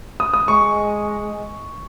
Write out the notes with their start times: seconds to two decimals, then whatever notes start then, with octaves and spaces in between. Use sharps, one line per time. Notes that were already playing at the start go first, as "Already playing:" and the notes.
0.20 D#6
0.34 D#6
0.48 G#3 C#6